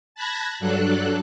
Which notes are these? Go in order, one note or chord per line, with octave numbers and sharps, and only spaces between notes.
A5 B5 F#6 G#6 A#6
G2 F#3 D4 A4 F#6